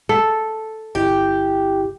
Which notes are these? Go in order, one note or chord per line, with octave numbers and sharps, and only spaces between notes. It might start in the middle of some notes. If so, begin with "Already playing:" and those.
A4
G1 E4 G4